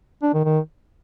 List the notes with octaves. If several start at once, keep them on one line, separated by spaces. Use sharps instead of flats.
D4
D#3
D#3